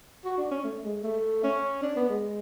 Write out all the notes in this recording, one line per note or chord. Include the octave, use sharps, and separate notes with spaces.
F#4
D4
C#4
A3
G#3
A3
C#4
D4
B3
G#3